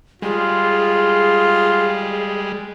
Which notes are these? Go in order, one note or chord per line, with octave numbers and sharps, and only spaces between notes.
G3 G#3 F4 G#4